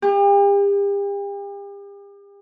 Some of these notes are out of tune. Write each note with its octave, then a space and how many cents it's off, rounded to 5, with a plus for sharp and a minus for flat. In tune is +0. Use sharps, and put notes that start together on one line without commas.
G4 +40